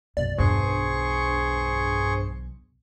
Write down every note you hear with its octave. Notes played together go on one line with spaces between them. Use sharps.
B1 F#2 D5
B1 E2 G2 G#4 C5 C#6